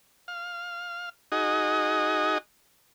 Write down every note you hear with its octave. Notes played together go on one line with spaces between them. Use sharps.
F5
D#4 F#4 G#4 D#5